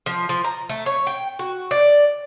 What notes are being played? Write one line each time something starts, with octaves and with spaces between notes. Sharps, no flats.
F3
F3
A#5
A3
C#5
G5
F#4
D5